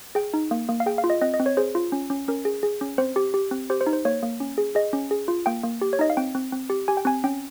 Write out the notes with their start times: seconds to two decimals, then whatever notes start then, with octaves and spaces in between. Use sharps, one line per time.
0.15 G#4 G5
0.34 D#4
0.51 A#3
0.69 A#3
0.80 F5
0.86 G#4 G5
0.98 F5
1.04 F4
1.10 D#5
1.21 C4 D#5
1.34 D#5
1.40 C4
1.46 C#5
1.57 G#4 C5
1.75 F4
1.92 C#4
2.10 C#4
2.28 C#4 A#4
2.45 G#4
2.63 G#4
2.81 C#4
2.98 C4 C5
3.16 G4
3.34 G4
3.51 C4
3.70 G4 C5
3.81 C5
3.87 D#4
3.93 C5
4.05 A#3 C#5
4.23 A#3
4.40 C#4
4.58 G#4
4.75 G#4 D#5
4.93 C#4
5.11 G#4
5.28 F4
5.46 A#3 G5
5.64 A#3
5.81 G4
5.93 C#5
5.99 D#4 D#5
6.10 F5
6.17 C4 G5
6.35 C4
6.52 C4
6.70 G4
6.88 G4 G#5
6.97 G5
7.05 C4 G#5
7.24 C#4 G5